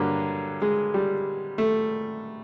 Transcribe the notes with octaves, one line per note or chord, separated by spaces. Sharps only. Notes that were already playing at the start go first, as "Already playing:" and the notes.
Already playing: G2 D3 F#3 A#3
G#3
G3
A3